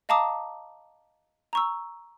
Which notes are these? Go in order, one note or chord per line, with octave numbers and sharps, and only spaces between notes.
D#5 F5 A5 A#5 D6 D#6
A#5 C#6 E6